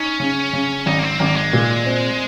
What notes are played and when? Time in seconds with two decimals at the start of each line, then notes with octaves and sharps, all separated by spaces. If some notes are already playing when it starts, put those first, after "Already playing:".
Already playing: C#4 D#4
0.20 C#3
0.53 C#3
0.86 G#1 D#4
0.99 A#3
1.03 C4
1.20 G#1 A#3
1.37 G#3
1.53 A#2
1.86 C4